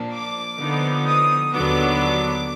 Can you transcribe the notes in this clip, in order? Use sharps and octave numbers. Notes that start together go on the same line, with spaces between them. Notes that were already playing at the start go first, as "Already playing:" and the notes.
Already playing: A#2 F3 A#3 D4
D6
D3 F3 B3 D#4
D#6
D#2 D3 F#3 B3 D4 D6